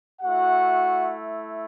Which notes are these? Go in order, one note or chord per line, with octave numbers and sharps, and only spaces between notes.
A3 E4 F#4 F#5